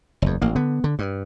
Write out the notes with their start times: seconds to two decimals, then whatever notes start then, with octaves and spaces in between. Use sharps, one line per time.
0.22 F#1 E2
0.42 A1 A#3
0.56 D3 B3
0.84 D3
0.99 G2